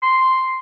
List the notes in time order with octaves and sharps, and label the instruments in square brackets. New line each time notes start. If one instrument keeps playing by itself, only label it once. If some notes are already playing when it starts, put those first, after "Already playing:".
[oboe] C6